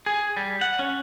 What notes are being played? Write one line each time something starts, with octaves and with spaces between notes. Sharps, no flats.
G#4
G3
F#5
C#4